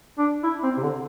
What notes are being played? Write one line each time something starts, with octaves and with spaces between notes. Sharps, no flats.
D4
E4
C4
C3
D3